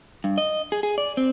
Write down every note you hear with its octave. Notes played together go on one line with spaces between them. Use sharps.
G2
D#5
G#4
G#4
D5
C4